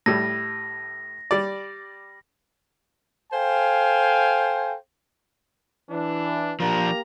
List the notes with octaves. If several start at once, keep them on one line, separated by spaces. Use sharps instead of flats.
A2 G3 A#6
G3 D5
A4 C5 F5 G5 G#5
E3 D4
F3 A#3 D4 G4 A#5